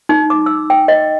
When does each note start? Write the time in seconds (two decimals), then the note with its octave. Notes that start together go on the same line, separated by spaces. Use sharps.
0.09 D#4
0.30 D6
0.46 E6
0.70 G5
0.88 D#5